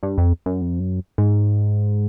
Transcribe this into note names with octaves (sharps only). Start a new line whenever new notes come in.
G2
F2
F#2
F2
F#2
G#2